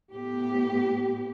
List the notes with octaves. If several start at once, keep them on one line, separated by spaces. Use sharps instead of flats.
A2 B3 G4